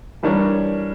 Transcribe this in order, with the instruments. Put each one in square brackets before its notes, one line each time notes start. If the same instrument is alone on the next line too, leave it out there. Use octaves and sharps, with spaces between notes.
[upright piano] E3 G3 D4 A#4 C#5